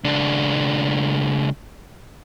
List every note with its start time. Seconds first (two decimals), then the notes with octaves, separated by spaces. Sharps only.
0.04 C#2 D4